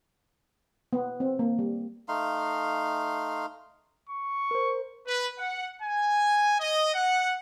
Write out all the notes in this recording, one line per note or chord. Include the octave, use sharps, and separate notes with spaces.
B3
C4
A#3
G3
A3 D#4 F5 C6
C#6
A#4 C5
B4
F#5
G#5
D#5
F#5